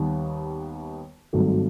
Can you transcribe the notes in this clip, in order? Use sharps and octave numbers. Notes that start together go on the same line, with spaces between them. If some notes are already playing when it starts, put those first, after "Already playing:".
Already playing: D#2 D#3 G3 B3
G#1 G2 D#3 F#3 A3